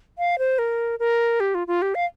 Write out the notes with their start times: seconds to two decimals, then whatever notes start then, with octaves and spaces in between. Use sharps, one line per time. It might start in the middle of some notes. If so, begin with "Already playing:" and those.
0.18 F5
0.39 C5
0.59 A#4
0.99 A#4
1.40 G4
1.55 F4
1.67 F4
1.82 G4
1.95 F5